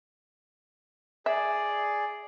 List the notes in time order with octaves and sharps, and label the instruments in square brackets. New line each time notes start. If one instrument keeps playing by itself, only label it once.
[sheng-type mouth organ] G#4 D5 [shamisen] E5